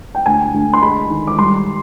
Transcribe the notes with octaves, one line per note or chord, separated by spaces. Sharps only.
G5
D2 G#5
D2
C6
G#3 B5
D#3
D6
G3 C6